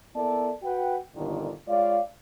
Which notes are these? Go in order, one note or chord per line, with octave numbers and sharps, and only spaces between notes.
B3 E4 A4 A#4 D5 A5
F#4 B4 F#5 G5
G1 C2 A#2 D3 D#3
G#3 F4 C#5 D5 F5